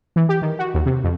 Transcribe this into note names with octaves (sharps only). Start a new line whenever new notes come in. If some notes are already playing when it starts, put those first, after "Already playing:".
E3
G4
D#3
F#4
D#2
C3
F2